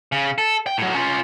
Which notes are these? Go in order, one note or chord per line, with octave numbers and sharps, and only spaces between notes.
C#3
A4
G5
A2 F#3
C#4 F4